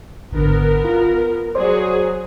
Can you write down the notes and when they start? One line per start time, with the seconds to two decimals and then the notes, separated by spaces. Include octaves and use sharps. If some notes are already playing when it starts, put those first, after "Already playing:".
0.31 G#1 D3 B3 A#4
0.85 F4
1.55 F#3 G#4 C5 D5